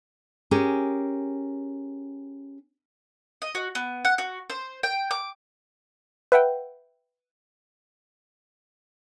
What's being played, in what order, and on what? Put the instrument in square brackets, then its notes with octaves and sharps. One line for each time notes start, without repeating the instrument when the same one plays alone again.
[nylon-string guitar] C#4 G4 G#4 A#4
[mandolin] D#5
F#4
B3
F#5
F#4
C5
G5
D6
[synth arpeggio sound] B4 E5 F#5 G5